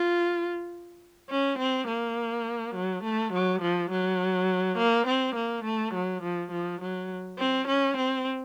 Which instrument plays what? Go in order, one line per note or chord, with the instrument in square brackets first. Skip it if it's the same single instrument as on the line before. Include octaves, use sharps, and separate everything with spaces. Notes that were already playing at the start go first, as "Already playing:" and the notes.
Already playing: [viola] F4
C#4
C4
A#3
F#3
A3
F#3
F3
F#3
A#3
C4
A#3
A3
F#3
F3
F3
F#3
C4
C#4
C4